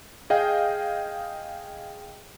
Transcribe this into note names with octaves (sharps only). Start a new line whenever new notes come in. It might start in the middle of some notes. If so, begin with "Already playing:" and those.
G#4 D#5 F5 G5